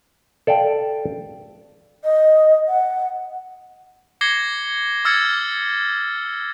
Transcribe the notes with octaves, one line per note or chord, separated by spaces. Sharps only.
A4 D5 F5 G5
D#5
F#5
D6 G#6 A#6 C7 C#7 G7
D6 E6 F6 G#6 A6 C#7